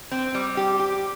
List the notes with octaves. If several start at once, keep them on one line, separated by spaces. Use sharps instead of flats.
C4
G3
G4
G4